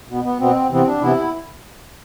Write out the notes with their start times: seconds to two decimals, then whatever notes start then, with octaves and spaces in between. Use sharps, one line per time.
0.09 B2 B3
0.24 B3
0.39 B2 B3 C4
0.70 C3 E3 B3 C4
0.86 D4
1.01 C3 E3 B3 E4